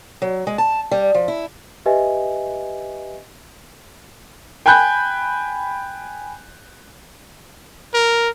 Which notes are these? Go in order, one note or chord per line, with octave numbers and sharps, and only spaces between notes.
F#3
G#3
A5
G3
F3
E4
G4 B4 D#5 E5 G#5
G5 G#5 B5 F#6 G6
A#4